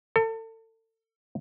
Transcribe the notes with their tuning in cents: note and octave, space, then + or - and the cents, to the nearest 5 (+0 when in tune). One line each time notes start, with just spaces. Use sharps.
A4 +35